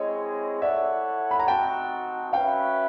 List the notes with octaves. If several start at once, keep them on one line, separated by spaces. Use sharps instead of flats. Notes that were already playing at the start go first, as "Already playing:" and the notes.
Already playing: G#3 C4 E4 G#4 C#5 D#5
E4 A4 C#5 D5 E5 F#5
B5
A#5
C4 D#4 F#4 G5 A5
C#4 F#4 B4 E5 F5 G5